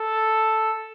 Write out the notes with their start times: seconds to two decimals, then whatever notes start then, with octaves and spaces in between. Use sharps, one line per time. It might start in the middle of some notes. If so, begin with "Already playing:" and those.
Already playing: A4